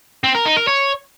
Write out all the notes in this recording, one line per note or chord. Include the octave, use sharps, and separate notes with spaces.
C4
A#4
D#4
A#4
C#5